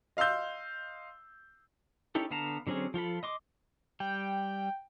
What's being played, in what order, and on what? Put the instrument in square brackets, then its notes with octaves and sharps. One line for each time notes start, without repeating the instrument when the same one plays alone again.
[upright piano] D#5 F5 C6 E6 G6
[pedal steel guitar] C#4 D#4 E4 G4 A4
D3 B3 F5 A5 A#5
D3 F#3 C4 C#4 G#4
F3 F4 A4 B5
D#5 C6 D6
[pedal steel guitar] G3 [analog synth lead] G5